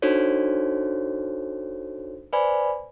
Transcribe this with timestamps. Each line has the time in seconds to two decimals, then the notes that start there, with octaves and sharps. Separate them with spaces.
0.02 D4 D#4 F#4 A4 C5 C#5
2.33 B4 C5 D5 G#5 B5